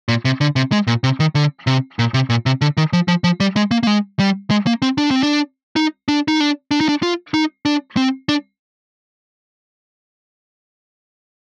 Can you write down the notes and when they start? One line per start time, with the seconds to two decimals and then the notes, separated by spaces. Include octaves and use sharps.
0.09 A#2
0.25 C3
0.41 D3
0.56 C3
0.72 G#3
0.87 A#2
1.04 C3
1.20 D#3
1.35 D3
1.67 C3
1.99 A#2
2.14 C3
2.30 A#2
2.46 C3
2.62 D3
2.77 D#3
2.93 F3
3.08 F3
3.24 F3
3.40 G3
3.56 G#3
3.71 A#3
3.83 A#3
3.87 G#3
4.19 G3
4.51 G#3
4.67 A#3
4.82 C4
4.98 D4
5.11 C4
5.23 D4
5.76 D#4
6.08 D4
6.28 D#4
6.40 D4
6.71 D4
6.81 D#4
6.89 D4
7.03 F4
7.34 D#4
7.65 D4
7.97 C4
8.29 D4